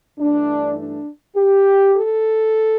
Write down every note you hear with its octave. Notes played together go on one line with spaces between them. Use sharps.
G2 E3 A3 D4
D4
G4
A4